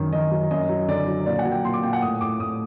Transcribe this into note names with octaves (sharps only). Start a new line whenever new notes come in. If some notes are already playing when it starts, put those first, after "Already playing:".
Already playing: F#2 D#3
D#3 D#5
F#3
F#2 D#5
F#3
D3 D5
F#3
A#2 D5
F#5
F#3
G5
A#2 C6
D6
A#2 G5
F#5
A2 D#6
A2 D6
A2 D#6